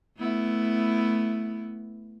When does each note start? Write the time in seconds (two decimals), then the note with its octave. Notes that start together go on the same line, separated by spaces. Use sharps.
0.17 A3 B3 E4